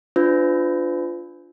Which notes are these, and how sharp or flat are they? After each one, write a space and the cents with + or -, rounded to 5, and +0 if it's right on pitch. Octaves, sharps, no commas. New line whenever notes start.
D4 +0 F4 +0 B4 +45